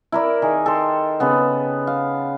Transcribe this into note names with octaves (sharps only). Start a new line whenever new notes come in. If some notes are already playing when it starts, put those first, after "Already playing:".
E4 A#4 D5
D#3 G#4
A4 G5 A5 C6
C#3 B3
F5